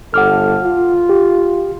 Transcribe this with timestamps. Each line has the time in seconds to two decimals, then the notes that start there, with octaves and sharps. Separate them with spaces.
0.14 G1 A4 F#5 D6 F6
0.62 F4
1.09 G4